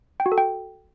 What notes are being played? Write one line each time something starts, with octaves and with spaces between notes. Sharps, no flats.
G5
F#4
A4
G5